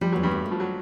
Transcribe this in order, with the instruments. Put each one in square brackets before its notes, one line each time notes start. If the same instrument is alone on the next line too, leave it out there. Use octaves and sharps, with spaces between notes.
[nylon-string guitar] F3 [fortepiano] G3
[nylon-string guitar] E2 [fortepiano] F#3
[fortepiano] G2 G3
[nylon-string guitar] A3
A3
[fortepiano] F3
F#3